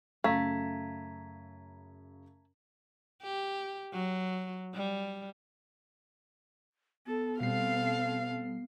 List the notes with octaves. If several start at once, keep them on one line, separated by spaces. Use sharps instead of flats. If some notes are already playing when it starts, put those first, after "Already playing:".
F#2 C#3 A3 F5 A#5 G#6 B6
G4
F#3
G3
B3 A4
B2 G3 C4 A4 F5 C7